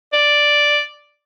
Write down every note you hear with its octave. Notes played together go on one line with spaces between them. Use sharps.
D5